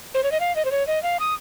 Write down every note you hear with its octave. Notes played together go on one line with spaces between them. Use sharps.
C5
C#5
D#5
F5
D#5
C5
C#5
D#5
F5
D#6